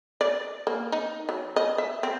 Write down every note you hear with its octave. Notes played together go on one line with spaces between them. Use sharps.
D5
A#3
D#4
F#3
D#5
E5
C4